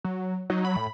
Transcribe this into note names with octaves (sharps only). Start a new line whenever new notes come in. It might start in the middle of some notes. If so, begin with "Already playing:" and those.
F#3
F#3 D#4
B5
A2